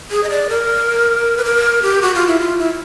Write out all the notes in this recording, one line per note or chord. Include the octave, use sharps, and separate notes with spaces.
G#4
D#5
D5
A#4
B4
A#4
G4
F#4
F4
E4
F4
E4